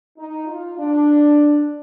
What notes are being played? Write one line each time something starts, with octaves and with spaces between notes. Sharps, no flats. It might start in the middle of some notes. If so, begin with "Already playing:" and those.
D#4
F4
D4